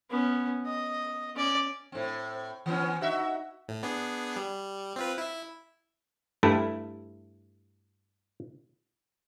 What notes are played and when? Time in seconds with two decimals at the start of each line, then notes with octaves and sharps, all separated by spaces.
0.10 B3 C#4
0.65 D#5
1.36 C#4 D5
1.92 A2 C4
2.66 E3 B3 C#4
3.01 D#4 F#4 E5
3.68 A2
3.83 B3 D4 G#4
4.36 G3
4.96 C4 F4 B4
5.18 E4 E5
6.43 G2 A3 E4